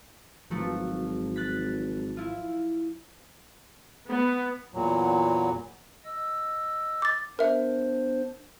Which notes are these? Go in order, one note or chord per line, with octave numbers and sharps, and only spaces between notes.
G#1 F3 F#3 A3
F#6 A6 B6
E4 F4
B3
E2 A#2 F#3
D#5 E6
D6 A6
B3 D4 A#4 C5 E5